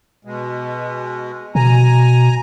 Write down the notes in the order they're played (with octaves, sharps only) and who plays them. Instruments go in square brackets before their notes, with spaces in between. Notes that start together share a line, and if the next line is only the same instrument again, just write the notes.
[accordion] B2 G#3
[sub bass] B2 [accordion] G#5 A#5